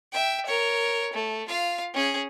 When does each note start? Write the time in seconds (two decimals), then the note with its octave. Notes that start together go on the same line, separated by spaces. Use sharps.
0.12 E5 G5
0.46 A#4 C#5
1.13 A3
1.48 F4 F5
1.94 C#4 G#4